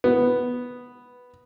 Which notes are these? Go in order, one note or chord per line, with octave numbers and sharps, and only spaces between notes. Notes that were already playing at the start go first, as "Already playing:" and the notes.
B3